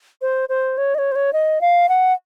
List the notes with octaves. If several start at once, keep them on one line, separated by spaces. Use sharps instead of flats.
C5
C5
C#5
D#5
C#5
C5
C#5
D#5
F5
F#5